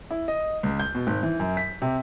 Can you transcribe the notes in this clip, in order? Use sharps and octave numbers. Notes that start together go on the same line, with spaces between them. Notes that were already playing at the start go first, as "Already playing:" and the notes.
E4
D#5
C#2
G6
B2
G#1
E3
F#2
B6
C3